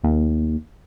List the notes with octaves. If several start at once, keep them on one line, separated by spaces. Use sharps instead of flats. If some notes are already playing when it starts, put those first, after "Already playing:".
D#2